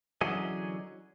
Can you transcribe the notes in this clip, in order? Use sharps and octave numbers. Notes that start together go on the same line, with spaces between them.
D3 E3 F#3 C#4 G#4 D#5